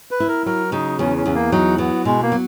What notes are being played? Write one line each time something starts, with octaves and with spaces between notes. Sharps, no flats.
B4
E4
A#4
F#3 A#4
C#3 D#4
E2 C#4
C#4
E2
A#3
F#3 D#4
F#3 B3
B2 G#3
A#3
F#3